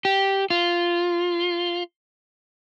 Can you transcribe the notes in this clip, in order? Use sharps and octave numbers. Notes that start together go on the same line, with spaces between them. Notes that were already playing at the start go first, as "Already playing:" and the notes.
G4
F4